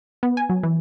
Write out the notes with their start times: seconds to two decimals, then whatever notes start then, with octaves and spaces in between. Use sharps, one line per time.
0.23 B3
0.37 G#5
0.50 F#3
0.63 E3